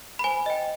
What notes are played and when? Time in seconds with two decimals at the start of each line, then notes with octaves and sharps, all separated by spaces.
0.19 B5
0.24 C5 G#5
0.46 D#5 G5